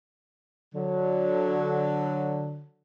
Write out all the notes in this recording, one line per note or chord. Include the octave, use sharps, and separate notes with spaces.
D3 F#3